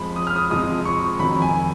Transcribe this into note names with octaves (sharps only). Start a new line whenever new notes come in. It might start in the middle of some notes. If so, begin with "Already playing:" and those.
Already playing: F2 F3 G#3 B5
D#6
F6
D#6
F2 F3 G#3 D#6
C#6
F2 D#3 F#3 B5
G#5